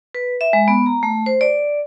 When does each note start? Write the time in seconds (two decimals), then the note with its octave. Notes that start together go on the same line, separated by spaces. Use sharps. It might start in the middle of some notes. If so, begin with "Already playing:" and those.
0.15 B4
0.41 E5
0.53 G#3
0.68 B3
0.86 A#5
1.03 A3
1.26 C5
1.41 D5